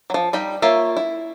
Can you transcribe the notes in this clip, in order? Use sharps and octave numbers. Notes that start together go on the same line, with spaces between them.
F3 F#3
G3 D#4 B5
A#3 F4 A#4 C#5 E5
E4